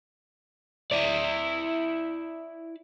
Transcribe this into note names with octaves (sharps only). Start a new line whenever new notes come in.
E4 D5